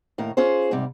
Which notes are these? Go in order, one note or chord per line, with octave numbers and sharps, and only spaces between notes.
D#2 A2 A#4
C#4 F4 G#4 C5
G#2 C3 G3